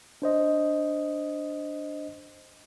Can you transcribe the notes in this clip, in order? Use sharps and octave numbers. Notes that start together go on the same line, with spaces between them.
D4 C5 D#5